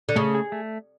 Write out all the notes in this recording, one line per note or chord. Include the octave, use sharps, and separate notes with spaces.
D3
C#3 A3
G#4
A3